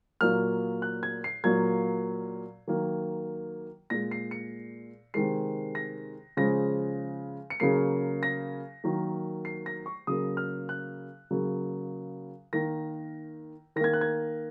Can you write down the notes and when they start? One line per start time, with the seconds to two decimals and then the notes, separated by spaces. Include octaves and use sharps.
0.21 A#2 F#3 A#3 F6
0.82 F#6
1.03 G#6
1.24 C7
1.44 A#2 F#3 A#3 G#6
2.67 D#3 F#3 A#3
3.90 A#2 G#3 A#6
4.11 C7
4.31 C#7
5.14 C3 D#3 G#3 C7
5.75 A#6
6.37 C#3 F3 G#3 A#6
7.50 C#7
7.60 C#3 F#3 A#3 C7
8.23 A#6
8.84 D#3 F#3 A#3
9.45 C7
9.66 A#6
9.86 C#6
10.07 C#3 F#3 A#3 D#6
10.37 F6
10.69 F#6
11.31 C#3 F#3 A#3
12.53 D#3 A#3 A#6
13.76 D#3 A#6
13.80 A#3 G#6
13.93 F#6
14.01 G#6